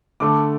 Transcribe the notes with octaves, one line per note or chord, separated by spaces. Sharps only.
D3 A3 D6